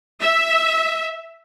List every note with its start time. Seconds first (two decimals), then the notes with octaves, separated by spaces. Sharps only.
0.21 E5